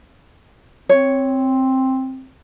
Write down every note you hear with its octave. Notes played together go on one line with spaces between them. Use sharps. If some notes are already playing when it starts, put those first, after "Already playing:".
C4 C#5